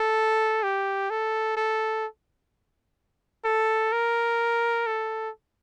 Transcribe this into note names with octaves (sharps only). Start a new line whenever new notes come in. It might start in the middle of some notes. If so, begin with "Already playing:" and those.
Already playing: A4
G4
A4
A4
A4
A#4
A4